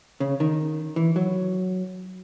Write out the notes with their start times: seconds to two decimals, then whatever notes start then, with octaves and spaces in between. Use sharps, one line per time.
0.20 C#3
0.40 D#3
0.96 E3
1.16 F#3